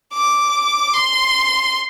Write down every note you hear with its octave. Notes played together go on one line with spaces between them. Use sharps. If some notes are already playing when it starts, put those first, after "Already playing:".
D6
C6